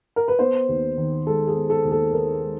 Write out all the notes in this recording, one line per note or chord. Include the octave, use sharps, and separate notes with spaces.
A#4
B4
B3 C5
D#2
D#3
G#3 A4
G#4
B3
A4
D#2
A4
D#3 A#4
G#3